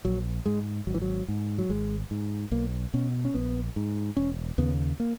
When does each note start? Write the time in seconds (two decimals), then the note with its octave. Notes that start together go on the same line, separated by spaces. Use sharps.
0.05 A#1 F#3
0.46 G#2 G#3
0.87 G#1 F#3
0.94 E3
1.02 F#3
1.28 G#2
1.58 F#3
1.69 G#1 G#3
2.11 G#2
2.51 B1 A#3
2.94 B2 C#4
3.25 C#4
3.34 A#1 B3
3.76 G#2
4.17 E1 C#4
4.58 D#2 C#3 B3
5.00 A#3